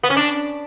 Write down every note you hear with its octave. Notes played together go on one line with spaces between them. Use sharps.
B3
C#4
D4